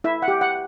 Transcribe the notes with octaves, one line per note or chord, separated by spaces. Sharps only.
E4 E5
F#5
G4
F#5